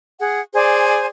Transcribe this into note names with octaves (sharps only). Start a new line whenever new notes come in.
G#4 F#5
G#4 C5 D5 G#5